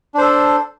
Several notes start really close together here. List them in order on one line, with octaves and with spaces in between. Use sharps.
D4 C5 A4